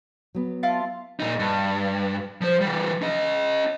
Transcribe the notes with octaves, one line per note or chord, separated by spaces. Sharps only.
F#3 B3
E4 F4 A5
A#2 D#4
G2
F3 C5
E3 G3
C#4 D#5